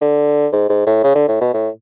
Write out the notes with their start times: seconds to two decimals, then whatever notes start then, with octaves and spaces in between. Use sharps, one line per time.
0.01 D3
0.53 G#2
0.69 G#2
0.86 A2
1.04 C#3
1.15 D3
1.28 A2
1.41 B2
1.54 A2